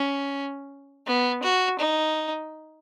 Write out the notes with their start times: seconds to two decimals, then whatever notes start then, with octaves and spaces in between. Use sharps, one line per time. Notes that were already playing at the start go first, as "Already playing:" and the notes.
Already playing: C#4
1.07 B3
1.43 F#4
1.79 D#4